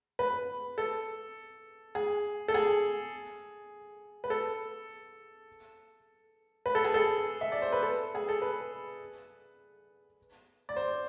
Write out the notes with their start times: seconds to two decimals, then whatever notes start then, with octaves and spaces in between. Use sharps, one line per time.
0.19 B4
0.78 A4
1.95 G#4
2.48 A4
2.54 G#4
4.24 B4
4.30 A4
6.66 B4
6.75 A4
6.84 G#4
6.94 A4
7.41 E5
7.52 D5
7.62 C5
7.72 B4
7.83 A4
8.15 G#4
8.29 A4
8.42 B4
10.69 D5
10.76 C5